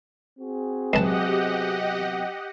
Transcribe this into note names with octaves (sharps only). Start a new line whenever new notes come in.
C4 F#4 G#4
C#2 C3 F#3 B3 G4 D#5 F#5 A5